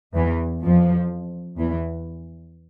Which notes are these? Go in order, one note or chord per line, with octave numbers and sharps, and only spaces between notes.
E2 E3
F2 F3
E2 E3